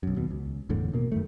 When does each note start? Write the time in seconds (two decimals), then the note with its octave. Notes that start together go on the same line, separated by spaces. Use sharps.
0.03 B1 F#2
0.16 D#2 B2
0.31 C#2
0.69 G1 E2 A2 D3
0.93 B2 A#3
1.12 F#2 D#3 A3